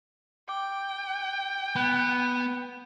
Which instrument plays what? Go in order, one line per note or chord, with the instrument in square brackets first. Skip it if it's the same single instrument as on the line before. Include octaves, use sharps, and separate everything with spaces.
[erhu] G5 [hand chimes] D6
[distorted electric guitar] B3 [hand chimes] B5 F#6